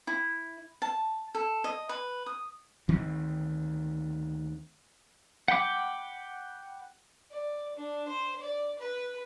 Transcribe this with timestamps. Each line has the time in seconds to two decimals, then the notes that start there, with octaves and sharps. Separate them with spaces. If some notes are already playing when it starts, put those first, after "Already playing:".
0.07 E4
0.82 A5
1.35 A4
1.64 D#5
1.89 B4
2.26 D#6
2.88 D2 D#3 C4
5.48 F#5 G5 B5 D6
7.31 D5
7.76 D4
8.08 C5
8.41 D5
8.79 B4